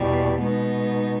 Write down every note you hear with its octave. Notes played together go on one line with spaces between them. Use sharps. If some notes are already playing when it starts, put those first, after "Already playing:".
Already playing: E2 B2 G3
B2 G#3 B3 D#4